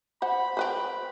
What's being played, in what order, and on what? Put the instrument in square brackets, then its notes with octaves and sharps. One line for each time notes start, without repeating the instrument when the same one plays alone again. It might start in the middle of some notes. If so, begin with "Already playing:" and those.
[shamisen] C5 F#5 [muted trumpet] B5
[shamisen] C4 B4 C5